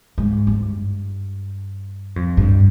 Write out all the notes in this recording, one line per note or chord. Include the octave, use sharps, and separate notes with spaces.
G#2
G2
F2
G2